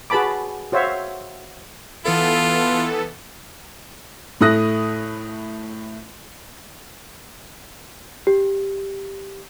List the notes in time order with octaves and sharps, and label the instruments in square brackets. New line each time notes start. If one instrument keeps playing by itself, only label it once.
[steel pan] F#4 G#4 B4 A5 B5 D6
F#4 C5 C#5 E5 F5
[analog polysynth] E3 B3 A4 [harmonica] F4
[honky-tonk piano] A2 A3 E4 D#6 F#6 A#6
[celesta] G4